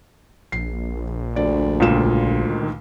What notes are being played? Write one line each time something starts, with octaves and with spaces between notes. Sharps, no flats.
A#1 C7
D2 D5
C#2 A#2 E7
D#3